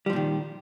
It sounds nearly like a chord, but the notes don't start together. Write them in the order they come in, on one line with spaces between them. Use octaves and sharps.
G3 F3 A#2 D#3